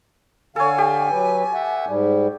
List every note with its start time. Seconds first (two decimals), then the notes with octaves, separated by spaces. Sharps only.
0.56 D3 A4 C#5 F5 G#5
0.78 G4
1.11 F#3 B4
1.54 E5 F#5
1.87 G#2 G3